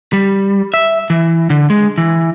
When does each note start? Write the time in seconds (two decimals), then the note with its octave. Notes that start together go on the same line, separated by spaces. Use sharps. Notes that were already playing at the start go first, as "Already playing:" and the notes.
0.13 G3
0.74 E5
1.10 E3
1.50 D3
1.70 G#3
1.98 E3